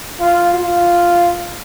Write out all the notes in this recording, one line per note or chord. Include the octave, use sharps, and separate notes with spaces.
F4
F4